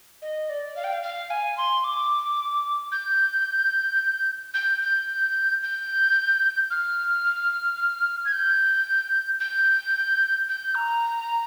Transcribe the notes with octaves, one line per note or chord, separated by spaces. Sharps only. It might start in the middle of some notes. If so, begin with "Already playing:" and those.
D#5
D5
F5
G5
F5
F5
G#5
C6
D6
G6
G6
G6
G6
F6
G#6
G6
G6
G6
A#5